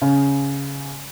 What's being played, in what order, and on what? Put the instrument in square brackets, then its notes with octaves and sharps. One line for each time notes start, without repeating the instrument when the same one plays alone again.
[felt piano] C#3